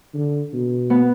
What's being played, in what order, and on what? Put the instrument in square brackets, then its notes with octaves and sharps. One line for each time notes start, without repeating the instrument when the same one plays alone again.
[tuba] D3
B2
[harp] B3